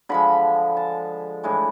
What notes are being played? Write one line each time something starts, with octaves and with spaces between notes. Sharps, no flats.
D3 F3 G#3 B5
A5
A2 E3 G#3 D4